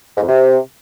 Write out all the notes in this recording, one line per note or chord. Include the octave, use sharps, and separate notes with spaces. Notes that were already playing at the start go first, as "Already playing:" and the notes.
G#2
F2
C3